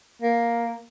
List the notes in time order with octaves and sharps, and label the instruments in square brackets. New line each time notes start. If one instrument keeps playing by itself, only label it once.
[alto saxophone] A#3